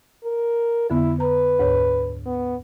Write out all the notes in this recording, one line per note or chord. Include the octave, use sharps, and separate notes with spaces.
A#4
F2 D3 B3 E4
B4 A#5
D2 G#2 C#5
B3